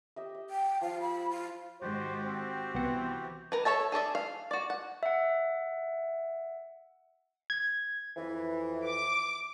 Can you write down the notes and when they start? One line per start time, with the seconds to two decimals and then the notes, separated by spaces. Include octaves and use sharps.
0.16 G4 D#5 E5
0.35 D#5
0.50 G5
0.81 F3 F5
1.01 B5
1.31 F4
1.81 G#2 D#3 F#4 G4 C5
2.23 C4
2.74 C2 E3 B3 F#5
3.52 A#4 B4
3.65 A4 C#5 E5 A5
3.92 G#4 A4 D5 E5
4.15 F5
4.51 F#4 D5
4.70 F#5
5.03 E5 F#5
7.50 G#6
8.17 F2 E3
8.86 D6